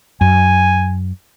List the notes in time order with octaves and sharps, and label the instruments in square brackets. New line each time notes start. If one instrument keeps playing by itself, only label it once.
[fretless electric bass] F#2 [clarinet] G#5